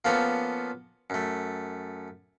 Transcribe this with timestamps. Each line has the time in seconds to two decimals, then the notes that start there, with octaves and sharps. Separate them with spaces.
0.05 F3 A#3 B3 C#4 A4 C5
1.10 F#2 A3